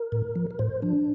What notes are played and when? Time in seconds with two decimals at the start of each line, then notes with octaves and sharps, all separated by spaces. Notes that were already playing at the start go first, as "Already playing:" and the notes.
Already playing: A#4
0.12 A2
0.35 F3
0.51 A#4
0.59 A2 C5
0.82 F3 D4